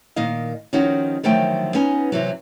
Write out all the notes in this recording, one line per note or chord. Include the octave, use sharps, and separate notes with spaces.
A#2 D#3 D#5 F5
D#3 F3 C#4 D#4 F#4
D3 D#3 F3 F#3 A3 G5
B3 C#4 D#4 G#5
C3 E3 F#3